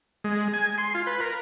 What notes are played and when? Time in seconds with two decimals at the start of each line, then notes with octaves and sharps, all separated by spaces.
0.24 G#3
0.54 G#5
0.78 C6
0.95 F4
1.07 B4
1.21 A#4